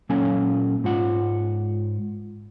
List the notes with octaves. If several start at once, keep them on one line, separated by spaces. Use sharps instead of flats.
A#2 F#3 A#3 C#4 A4 G#5
G#2 F4 F#5